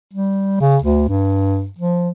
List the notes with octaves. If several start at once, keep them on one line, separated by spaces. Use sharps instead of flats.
G3
C#3
D2
G2
F3